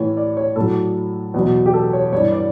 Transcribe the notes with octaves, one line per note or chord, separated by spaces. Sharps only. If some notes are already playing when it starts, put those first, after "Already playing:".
Already playing: A2 E3 C#5
D5
C#5
A2 F#3 A4
E2 B2 F#3
G4
A4
C#5
G2 E3 C#5
D5